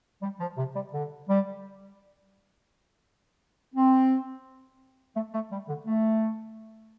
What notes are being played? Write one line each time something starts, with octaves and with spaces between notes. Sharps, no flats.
G3
F3
C3
G3
D3
G3
C4
A3
A3
G3
D3
A3